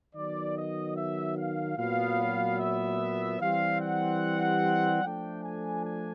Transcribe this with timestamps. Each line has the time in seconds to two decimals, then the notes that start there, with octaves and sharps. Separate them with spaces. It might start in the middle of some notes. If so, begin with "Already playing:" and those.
0.15 D#3 F#3 B3 D5
0.56 D#5
0.97 E5
1.38 F5
1.78 A#2 F#3 B3 F5
2.59 E5
3.40 E3 G3 C4 F5
3.81 F#5
5.03 F3 A3 D4 G5
5.43 G#5
5.84 G#5